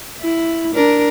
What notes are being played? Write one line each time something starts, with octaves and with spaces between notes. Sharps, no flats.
E4
D4 A#4